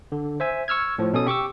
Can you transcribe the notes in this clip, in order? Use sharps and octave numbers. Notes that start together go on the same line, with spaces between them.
D3
C5 E5 G#5
C#6 E6 F6 G#6
A2 F3
B2 C#4 A4 D#6
G4 C#6 D6 E6